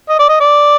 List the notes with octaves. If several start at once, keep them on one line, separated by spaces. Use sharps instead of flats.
D#5
D5
D#5
D5